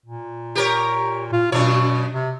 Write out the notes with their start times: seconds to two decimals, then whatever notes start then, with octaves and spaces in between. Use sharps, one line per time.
0.06 A#2
0.55 G4 A#4 C#5
1.33 F4
1.52 F#2 B2 D4 C#5
2.14 C3